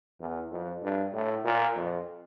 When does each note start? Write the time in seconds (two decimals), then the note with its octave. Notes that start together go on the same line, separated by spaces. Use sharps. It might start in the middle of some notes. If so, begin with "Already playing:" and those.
0.21 E2
0.51 F2
0.83 G2
1.13 A2
1.44 A#2
1.76 F2